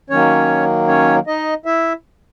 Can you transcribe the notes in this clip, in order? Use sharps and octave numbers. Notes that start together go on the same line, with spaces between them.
D#3 F#3 A#3 C#4 C#5
C#4 C#5
D#4 D#5
E4 E5